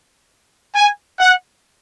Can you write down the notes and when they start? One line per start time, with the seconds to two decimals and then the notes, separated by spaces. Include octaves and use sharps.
0.75 G#5
1.20 F#5